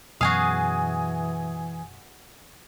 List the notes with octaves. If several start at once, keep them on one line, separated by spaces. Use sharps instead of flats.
F#2 B2 E3 F#4 G#4 F5 G#5 D#6